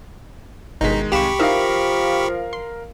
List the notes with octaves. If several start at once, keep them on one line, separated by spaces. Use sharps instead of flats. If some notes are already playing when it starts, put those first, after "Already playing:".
G1 B2 D#3 G#3 D#4 B6
C2 G4 F5 B5 C#6 E7
F3 D#4 E4 A#4 E5 F5
C6